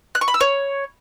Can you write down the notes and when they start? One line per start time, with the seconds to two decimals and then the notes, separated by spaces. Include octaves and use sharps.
0.15 F#6
0.21 C#6
0.28 B5
0.34 E6
0.41 C#5